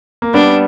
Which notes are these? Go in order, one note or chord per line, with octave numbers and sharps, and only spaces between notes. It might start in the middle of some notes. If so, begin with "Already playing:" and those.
A#3
G3 B3 D4